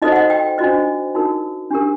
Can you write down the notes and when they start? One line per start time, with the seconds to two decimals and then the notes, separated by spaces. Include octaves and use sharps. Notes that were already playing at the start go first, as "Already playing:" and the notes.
0.02 D#4 F#4 A4 C5 D#5
0.12 F#5
0.16 D#5
0.30 G5
0.58 D4 F#4 C5 D#5
1.15 D#4 F#4 A#4
1.71 D4 G4 A#4